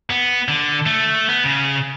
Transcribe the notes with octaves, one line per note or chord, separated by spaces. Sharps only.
B3
D3
A3
B3
C#3